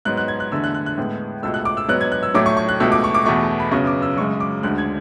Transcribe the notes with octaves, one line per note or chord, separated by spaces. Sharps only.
G#2 F#3 B3 F#6
F#6
G#6
F#6
E2 D3 A3 E6
F#6
F#6
F#6
A2 G#3 B3
C#2 B2 A3 E6
F#6
D6
E6
G#2 F#3 B3 F#6
G#6
F#6
E6
A2 F#3 A3 D6
C#6
C#6
F#6
C#2 B2 A3 E6
D6
C#6
D6
E2 B2 A3 C#6
B5
F#2 C#3 F#3 B3 C#6
D6
E6
F#2 C#3 G#3 C#6
D6
D2 D3 G#3 F#6
G#6